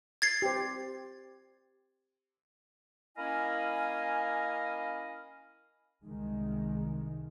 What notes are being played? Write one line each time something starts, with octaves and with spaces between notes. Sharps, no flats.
G#6 A6 C7
G4 C5
A#3 C#4 E4 D#5 F5 G#5
C2 D#3 G#3